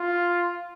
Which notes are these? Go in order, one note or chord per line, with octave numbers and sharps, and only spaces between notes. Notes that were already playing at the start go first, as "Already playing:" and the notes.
Already playing: F4